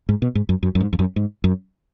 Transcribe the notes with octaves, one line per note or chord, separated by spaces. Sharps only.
G#2
B2
G#2
F#2
F#2
F#2
G#2
F2
F#2
G#2
F#2